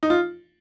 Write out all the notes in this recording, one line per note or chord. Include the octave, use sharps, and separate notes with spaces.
D#4
F4